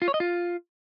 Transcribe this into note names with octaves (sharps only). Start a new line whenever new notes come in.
F4
C#5
D#5
F4